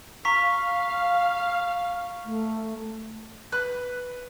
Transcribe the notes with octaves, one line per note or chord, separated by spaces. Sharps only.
F5 A#5 C#6 B6
A3
B4 F#6